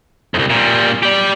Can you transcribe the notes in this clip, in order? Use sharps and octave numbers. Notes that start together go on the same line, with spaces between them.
C2 F2
A#2 G3
G4 D5